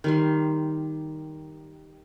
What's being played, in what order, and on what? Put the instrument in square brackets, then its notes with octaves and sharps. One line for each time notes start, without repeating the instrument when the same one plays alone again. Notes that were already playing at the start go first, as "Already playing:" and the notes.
[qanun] D#3 G3 C6